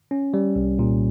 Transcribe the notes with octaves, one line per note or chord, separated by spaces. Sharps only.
C#4
G3
C2
A#2